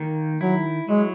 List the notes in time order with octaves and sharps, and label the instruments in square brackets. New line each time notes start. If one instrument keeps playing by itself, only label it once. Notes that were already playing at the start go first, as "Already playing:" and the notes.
Already playing: [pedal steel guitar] D#3 A#3
[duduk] F#3 [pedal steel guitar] E4
[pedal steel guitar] F#3 [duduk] G#3